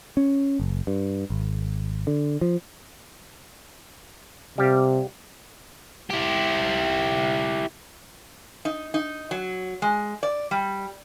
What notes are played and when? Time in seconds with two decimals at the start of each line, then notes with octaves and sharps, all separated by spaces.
0.17 C#4
0.60 F#1
0.87 G2
1.30 G#1
2.07 D3
2.41 F3
4.58 C3 G3 G4 F5
6.10 E4 G4
8.65 D#4
8.94 D#4
9.31 F#3
9.82 G#3
10.23 D5
10.51 G3